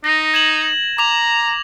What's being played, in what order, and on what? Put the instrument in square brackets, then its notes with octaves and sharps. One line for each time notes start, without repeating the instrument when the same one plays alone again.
[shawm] D#4 [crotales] A#6
[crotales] G#6 E7 F#7
[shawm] A#5 [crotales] D6 A#6 F7